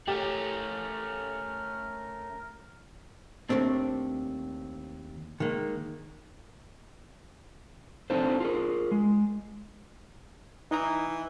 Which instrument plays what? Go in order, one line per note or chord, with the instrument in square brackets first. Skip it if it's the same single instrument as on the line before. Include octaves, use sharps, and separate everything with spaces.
[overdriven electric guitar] A3 C#4 [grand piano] G4 [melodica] A#4
[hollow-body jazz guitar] D#2 G#2 A3 C4 D4
D#3 G#3 A#3
[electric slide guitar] C4 D4 D#4 F4 A4 C5
F4 G#4 A#4
G#3
[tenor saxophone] E3 [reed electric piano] D#4 D#5 A#5